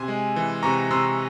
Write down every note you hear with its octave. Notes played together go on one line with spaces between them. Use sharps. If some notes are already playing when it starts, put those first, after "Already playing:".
Already playing: C3 G#5 C6
G#3
E3
C3 A#5 C#6
C3 C6 E6